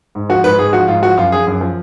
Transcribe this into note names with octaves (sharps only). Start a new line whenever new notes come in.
G#2
F3 F#4
G#2 B4
G#2 G#4
F3 F#4
G#2 F4
F3 F#4
F#2 F4
F3 G#4
F#2
F3